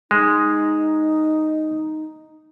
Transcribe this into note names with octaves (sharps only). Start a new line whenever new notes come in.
G#3 D#4